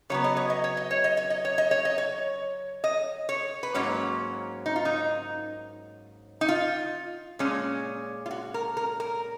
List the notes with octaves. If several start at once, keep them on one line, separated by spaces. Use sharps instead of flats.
C#3 F#3 B3 C#5
D#5
C#5
D#5
C#5
D#5
C#5
D#5
C#5
D#5
C#5
D#5
C#5
D#5
C#5
D#5
C#5
B4
G#2 F#3 A#3 C#4 C#5
D#4
F4
D#4
D#4
F4
A#2 G#3 C#4
F4
F#4
A#4
A#4
A#4